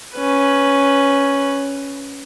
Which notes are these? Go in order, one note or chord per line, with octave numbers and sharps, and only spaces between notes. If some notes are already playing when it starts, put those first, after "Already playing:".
C#4 B4